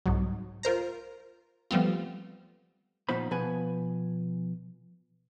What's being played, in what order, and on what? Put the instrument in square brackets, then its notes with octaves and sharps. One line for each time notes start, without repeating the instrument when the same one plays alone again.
[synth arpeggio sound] C2 G#2 F#3
F4 A#4 C5 A#5
F3 G3 A3 B3 C4 F4
[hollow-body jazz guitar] A#2 F3 B3 D#4 C5 B5
B2 F3 B3 B4 G#5